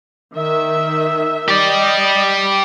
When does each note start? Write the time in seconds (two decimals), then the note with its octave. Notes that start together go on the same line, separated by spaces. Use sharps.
0.33 D#3 E5
1.48 G4 D5 D#5